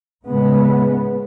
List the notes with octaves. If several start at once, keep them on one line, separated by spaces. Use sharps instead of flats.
A2 C#3 G#3 B3